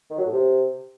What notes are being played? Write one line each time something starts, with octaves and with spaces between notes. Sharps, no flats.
D#3
F#3
A2
C3